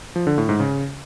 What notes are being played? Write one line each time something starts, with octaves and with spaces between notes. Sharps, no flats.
F3
D3
A2
G#2
C#3